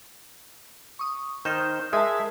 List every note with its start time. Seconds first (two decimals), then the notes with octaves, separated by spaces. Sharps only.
0.99 C#6 D#6
1.45 D#3 D#4 C5 F6 G6 E7
1.93 G#3 G#4 A#4 E5 A5 D#6